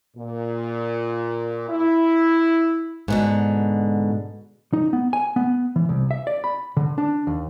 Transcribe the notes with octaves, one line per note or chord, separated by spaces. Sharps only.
A#2
E4
G#2 B2 D3
D#4
B3
G#5
B3
E3
C2
E5
D5
B5
D3
D4
D#2